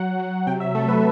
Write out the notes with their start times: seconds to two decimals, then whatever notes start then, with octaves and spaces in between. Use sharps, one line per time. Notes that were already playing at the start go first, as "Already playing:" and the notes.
Already playing: F#3 F#5
0.19 F#3
0.47 C3 G5
0.60 E5
0.75 A3 A4
0.88 B4